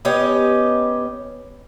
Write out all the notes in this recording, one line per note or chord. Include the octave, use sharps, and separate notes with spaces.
B3 C#4 G4 D#5